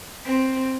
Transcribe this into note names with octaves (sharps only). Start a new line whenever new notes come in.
C4